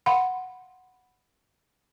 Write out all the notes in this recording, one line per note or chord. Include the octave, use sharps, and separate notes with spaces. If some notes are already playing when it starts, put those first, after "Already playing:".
F5 F#5 B5 C6